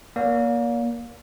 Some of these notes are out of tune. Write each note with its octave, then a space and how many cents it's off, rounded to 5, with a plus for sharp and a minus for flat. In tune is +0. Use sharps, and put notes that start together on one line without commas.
A#3 +25 D5 -45